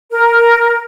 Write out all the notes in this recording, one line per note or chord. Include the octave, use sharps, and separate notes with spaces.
A#4